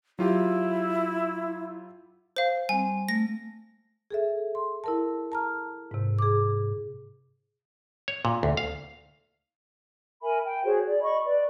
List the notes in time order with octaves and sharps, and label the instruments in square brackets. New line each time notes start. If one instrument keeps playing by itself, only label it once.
[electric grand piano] F#3 F4 G4 [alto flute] E4
[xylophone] C5 F5
[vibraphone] G3 C4 [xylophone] G#5
[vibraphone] A3 [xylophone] A#6
[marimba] G#4 A4 E5
C6
E4 A#4 A5
A5 A#5 F6
G#2 C3
G#4 D6
[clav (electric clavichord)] C#5
A#2
D2
F5
[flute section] A#4 E5 G#5 B5
G5
F#4 G#4 C5 C#5
D5
D#5 B5 C#6
B4 D5